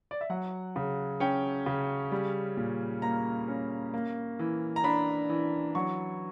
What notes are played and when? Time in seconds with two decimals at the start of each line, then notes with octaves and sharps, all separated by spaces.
0.11 D5
0.21 E5
0.30 F#3 F#5
0.76 C#3
1.20 C#4 G5
1.66 C#3
2.12 G3
2.57 A#2
3.02 A#3 A#5
3.48 C#4
3.94 A#3
4.39 E3
4.76 A#5
4.84 D4 B5
5.29 E3
5.75 F#3 C#6